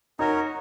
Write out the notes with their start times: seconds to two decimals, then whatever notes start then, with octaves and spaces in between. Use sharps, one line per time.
0.19 C#4 D#4 F#4 A#4 C#5